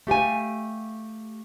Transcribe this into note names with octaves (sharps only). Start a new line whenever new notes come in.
A3 G4 F5 G#5